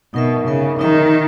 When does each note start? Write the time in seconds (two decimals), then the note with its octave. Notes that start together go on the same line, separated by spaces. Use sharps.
0.14 B2 D#4 A#4 E5
0.46 C#3 D#4 A#4 E5
0.79 D#3 D#4 A#4 E5
1.12 D#4